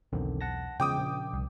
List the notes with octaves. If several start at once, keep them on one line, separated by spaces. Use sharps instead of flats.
B1 E2 D3 D#3 C4
F#5 A5 A#6
E2 C#3 F3 G#3 G5 D6 D#6
A#1
C2